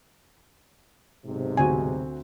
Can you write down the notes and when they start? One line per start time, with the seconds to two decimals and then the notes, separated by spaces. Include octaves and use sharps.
1.25 B1 G#2 C3
1.57 D2 C4 F#4 G#5